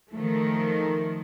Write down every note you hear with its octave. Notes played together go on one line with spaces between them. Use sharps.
D#3 F3 A3